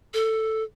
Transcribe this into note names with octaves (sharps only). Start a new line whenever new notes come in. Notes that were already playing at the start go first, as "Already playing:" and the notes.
A4